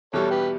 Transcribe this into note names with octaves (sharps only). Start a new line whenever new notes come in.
E2 B2 G3 A4 C#5
G4 B4